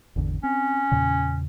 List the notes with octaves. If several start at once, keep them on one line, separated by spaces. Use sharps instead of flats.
G#1 E2 D3
C4 C#4
E2 A#2 C#3